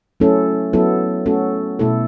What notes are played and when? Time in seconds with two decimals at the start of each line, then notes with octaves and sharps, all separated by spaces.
0.20 F#3 A3 C#4 E4 A4
0.73 F#3 B3 E4 A4
1.26 A3 C#4 F#4 A4
1.79 B2 A3 E4 A4